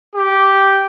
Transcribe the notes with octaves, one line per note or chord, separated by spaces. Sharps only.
G4